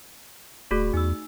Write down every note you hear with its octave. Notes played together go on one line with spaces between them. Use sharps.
D#1 A3 F#4 G#4
E2 D#4 E6